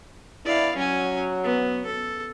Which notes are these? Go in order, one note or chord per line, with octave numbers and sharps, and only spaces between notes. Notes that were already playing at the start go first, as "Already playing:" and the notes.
B3 D4 E4 D5 F5
F#3 C#4 G#5
B3
A4